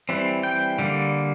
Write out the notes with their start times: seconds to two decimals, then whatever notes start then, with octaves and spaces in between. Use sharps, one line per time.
0.09 E3 G3 C4
0.43 G5
0.79 D3 G3 A#3